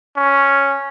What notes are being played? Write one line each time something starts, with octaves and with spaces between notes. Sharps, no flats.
C#4